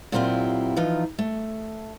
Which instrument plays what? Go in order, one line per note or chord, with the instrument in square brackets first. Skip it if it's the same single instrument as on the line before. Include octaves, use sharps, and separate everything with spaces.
[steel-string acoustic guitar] A#2 F#3 C4 E4 F4 G4
E3 F3 D#4 F4
A3